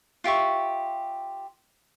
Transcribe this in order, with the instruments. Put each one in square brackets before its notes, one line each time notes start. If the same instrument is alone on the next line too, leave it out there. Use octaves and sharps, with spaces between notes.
[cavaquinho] F4 G4 E5 C#6